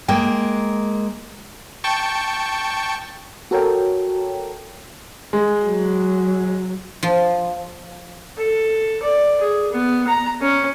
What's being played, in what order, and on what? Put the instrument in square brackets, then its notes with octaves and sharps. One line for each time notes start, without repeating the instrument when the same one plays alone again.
[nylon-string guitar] G#3 A#3 G5
[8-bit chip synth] G5 A5 C#6
[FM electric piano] F#4 A4 A#4 C#5 G5
[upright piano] G#3
[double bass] F#3
[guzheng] F3
[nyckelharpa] A4
D5
G#4
B3
A#5
C#4